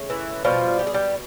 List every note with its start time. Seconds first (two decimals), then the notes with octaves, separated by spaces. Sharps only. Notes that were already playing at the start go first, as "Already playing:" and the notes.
Already playing: C#3 A3
0.10 E3 E4
0.45 B2 F3 G3 F4
0.79 G4
0.87 G#4
0.94 G3 G4